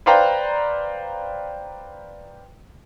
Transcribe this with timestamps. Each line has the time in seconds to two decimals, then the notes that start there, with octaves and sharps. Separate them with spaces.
0.06 B4 C5 D5 F5 G5 A#5